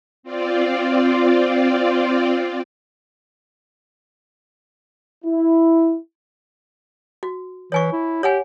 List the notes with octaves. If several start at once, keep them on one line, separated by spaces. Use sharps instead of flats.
C4 F4 D5
E4
F#4
E3 C#5 G#5 C#6
E4
G4 C#5 F#5 G#5